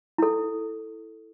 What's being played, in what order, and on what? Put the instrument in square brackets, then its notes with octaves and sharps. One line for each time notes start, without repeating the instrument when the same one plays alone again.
[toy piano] E4 A4